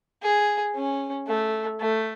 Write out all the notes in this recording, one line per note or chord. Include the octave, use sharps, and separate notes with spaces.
G#4
C#4
A3
A3